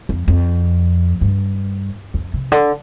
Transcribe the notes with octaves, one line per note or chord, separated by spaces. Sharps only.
F2
F2
G2
F2
C3
D3